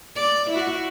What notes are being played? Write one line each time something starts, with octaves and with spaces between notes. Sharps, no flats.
D5
E4 F#4